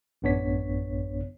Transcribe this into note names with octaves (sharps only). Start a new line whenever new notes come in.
A1 F#2 B3 D4 C#5 B6